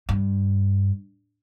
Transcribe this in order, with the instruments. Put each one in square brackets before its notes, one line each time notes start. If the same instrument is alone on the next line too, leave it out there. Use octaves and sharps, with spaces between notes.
[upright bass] G2